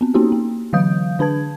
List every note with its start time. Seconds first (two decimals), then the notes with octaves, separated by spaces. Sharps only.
0.01 B3 C4
0.14 A#3 C#4 D#4 F#4 G4
0.32 A#3
0.73 D3 E3 F#3 F5 D#6 G6
1.19 D3 D4 B4 A5 G#6